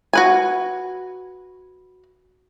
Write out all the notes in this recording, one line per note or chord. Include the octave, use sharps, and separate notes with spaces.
F#4 B4 G#5